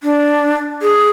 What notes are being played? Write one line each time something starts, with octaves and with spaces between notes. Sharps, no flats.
D4
G#4